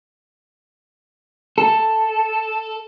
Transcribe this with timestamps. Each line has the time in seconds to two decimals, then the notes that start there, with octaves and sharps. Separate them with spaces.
1.58 A4